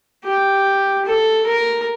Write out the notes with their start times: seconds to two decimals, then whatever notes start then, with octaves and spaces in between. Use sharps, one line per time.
0.24 G4
1.05 A4
1.46 A#4